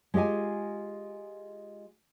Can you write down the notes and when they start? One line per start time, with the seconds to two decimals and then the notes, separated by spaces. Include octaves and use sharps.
0.14 G#3 F4 G4 D#5 G#5